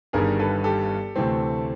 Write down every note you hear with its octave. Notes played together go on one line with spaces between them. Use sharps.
G1 G2 D#3 G3 G#4 A#4
A4 B4
G4 A4
D2 C3 E3 A3 C4